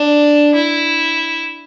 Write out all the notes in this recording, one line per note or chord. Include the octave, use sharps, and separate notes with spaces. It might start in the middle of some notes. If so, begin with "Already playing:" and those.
Already playing: D4
E4